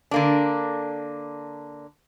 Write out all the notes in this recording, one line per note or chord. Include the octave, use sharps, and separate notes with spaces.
D3 A#3 D4